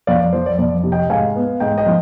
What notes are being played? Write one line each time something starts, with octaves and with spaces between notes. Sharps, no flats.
F2 D5 F5
D5
F3 C5
D5
F2 D5
C3
D#5 G5
G#2 F5 G#5
B3
G#2 D#5 G5
D#5 G5
F3